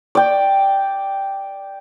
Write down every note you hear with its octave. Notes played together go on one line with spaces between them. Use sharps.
D5 G5